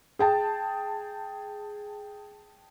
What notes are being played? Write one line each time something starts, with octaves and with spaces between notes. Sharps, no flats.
G#4 G5 A5